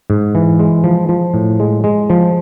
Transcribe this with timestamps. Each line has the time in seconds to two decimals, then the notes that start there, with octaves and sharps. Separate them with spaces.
0.10 G#2
0.35 E3
0.60 G#3
0.84 F3
1.09 F3
1.34 A2
1.60 G#3
1.84 G#3
2.10 F3